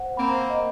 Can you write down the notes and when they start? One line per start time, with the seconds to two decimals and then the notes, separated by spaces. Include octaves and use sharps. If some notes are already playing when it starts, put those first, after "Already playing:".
Already playing: C5 F#5
0.17 A#3 C4 B5
0.50 D#5